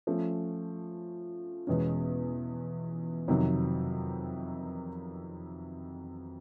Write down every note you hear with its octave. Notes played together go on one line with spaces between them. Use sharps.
F3 A3 C#4
E2 B2 G#3 C#4
F2 C3 D#3 F#3